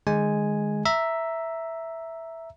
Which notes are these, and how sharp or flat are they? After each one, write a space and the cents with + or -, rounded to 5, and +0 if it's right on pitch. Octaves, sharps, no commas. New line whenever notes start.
D#3 -40 G#3 +0 G#5 +0
E5 +0 A#5 +0